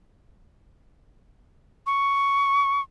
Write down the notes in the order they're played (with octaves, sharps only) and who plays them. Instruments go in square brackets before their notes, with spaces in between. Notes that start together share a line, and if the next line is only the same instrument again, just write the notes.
[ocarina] C#6